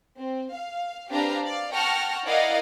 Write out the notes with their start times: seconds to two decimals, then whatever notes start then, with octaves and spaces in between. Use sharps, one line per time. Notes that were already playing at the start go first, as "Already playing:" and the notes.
0.17 C4
0.53 F5
1.09 C4 D4 G4 B4 F5 A#5
1.44 D5 F5
1.74 F#5 G5 A5 C#6 F6 A#6
2.26 E4 A#4 D5 D#5 F5 F#5